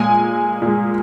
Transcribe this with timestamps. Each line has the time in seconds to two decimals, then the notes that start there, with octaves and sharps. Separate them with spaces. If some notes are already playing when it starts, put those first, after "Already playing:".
Already playing: A#2 G#3 G#5
0.62 A#2 G#3